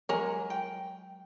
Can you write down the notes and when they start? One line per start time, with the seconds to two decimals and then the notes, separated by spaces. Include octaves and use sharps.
0.09 F#3 G#3 A#4 C#5 G#5
0.50 G5